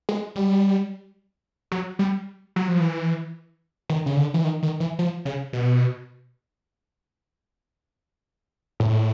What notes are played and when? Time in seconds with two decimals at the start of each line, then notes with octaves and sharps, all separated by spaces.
0.09 G#3
0.36 G3
1.72 F#3
1.99 G3
2.56 F#3
2.69 F3
2.80 E3
3.89 D#3
4.06 C#3
4.17 D3
4.34 E3
4.44 D#3
4.63 D#3
4.80 E3
4.99 F3
5.25 C#3
5.53 B2
8.80 A2